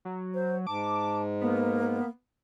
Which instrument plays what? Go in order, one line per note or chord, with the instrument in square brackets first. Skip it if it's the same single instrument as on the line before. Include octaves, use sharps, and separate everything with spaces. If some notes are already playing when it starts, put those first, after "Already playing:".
[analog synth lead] F#3
[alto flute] C5
[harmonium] G#2 [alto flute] A5 [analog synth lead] D6
[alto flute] A#3 [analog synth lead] B3